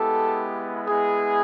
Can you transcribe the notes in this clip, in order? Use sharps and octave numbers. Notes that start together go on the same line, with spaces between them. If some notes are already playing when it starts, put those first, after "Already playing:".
Already playing: G#3 B3 E4 G4 A4
G#3 B3 E4 G#4